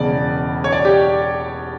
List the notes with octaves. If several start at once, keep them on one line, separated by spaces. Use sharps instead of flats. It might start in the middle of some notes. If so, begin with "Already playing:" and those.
Already playing: E1 E2 C#3 D5
C#5
D5
G4